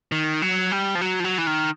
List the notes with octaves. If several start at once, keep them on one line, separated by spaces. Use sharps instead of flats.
D#3
F#3
G3
F3
F#3
F3
F#3
E3
D#3